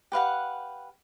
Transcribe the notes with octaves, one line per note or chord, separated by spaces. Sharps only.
G4 B4 F5 F#5